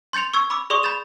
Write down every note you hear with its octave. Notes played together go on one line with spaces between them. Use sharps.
C6 G6 A6 C#7 F7
C#6 E6 G#6
B5 D6 E6
G#4 D5 C6 C#6 D#6
B5 G6 A6 E7